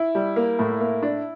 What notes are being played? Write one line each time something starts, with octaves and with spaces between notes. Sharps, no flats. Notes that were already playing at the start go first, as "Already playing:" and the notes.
Already playing: E4
G3
A#3
A2
A#3
D4